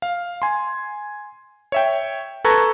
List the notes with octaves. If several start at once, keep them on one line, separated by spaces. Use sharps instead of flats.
F5
G#5 C6
C#5 E5 G5
A4 B4 A5 A#5 C#6 G#6